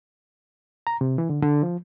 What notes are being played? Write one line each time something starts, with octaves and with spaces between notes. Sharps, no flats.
A#5
C3
E3
D3
D3
F3